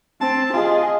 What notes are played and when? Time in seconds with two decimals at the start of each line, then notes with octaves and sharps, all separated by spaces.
0.21 C4 A5
0.54 F4 G#4 D#5